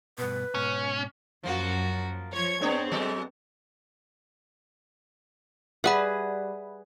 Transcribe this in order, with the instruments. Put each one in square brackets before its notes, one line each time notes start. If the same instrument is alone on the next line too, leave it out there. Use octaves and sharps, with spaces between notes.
[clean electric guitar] G2 B2 [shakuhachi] B4
[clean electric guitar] G#2 B2 [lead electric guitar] C#4
[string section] F#2 F#4 [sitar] F3 A#3
[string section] F3 C#5 G#6
[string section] B3 C4 [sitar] D4 G#4 C#5
[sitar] F#3 G#3 A4
[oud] G3 [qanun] G#4 B4 [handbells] E5 F#5 B5